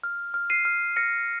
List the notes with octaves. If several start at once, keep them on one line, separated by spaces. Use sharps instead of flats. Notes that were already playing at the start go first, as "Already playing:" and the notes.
F6
F6
C7 D#7
F6
F6 A#6 C#7